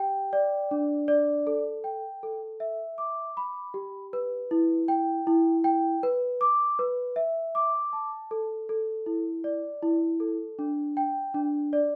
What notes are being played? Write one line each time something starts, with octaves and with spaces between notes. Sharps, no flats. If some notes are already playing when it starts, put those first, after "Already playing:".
Already playing: G4 G5
D5
D4
D5
A4
G5
A4
E5
D6
B5
G4
B4
E4
G5
E4
G5
B4
D6
B4
E5
D6
A5
A4
A4
E4
D5
E4
A4
D4
G5
D4
D5